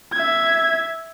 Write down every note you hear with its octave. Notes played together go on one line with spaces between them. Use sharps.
E5 G#6